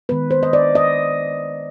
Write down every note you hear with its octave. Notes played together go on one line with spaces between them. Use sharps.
D#3 G#3 B3 B4
C5
D#5
D5
D#5